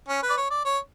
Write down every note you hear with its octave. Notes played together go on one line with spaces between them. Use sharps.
C#4
B4
D5
C#5
D5
C#5